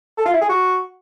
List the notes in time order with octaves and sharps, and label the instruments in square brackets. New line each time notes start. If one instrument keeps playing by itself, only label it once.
[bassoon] A4
F4
E4
G#4
F#4